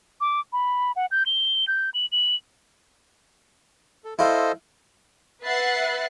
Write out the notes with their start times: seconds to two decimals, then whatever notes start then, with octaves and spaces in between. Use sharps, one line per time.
0.21 D6
0.53 B5
0.96 F#5
1.11 G6
1.26 G7
1.68 G6
1.94 F#7
2.12 F#7
4.05 A4
4.19 E4 F4 A4 C5 D#5
5.44 B4 E5 F#5 F#6 A6 C7